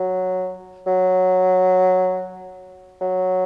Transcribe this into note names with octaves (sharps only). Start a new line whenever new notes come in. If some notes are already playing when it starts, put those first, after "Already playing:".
Already playing: F#3
F#3
F#3